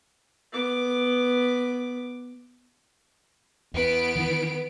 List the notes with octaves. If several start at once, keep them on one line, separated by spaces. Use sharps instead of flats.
B3 D6
E2 B3 D7
D#3 E3